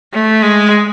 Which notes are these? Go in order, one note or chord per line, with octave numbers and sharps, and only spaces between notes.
A3
G#3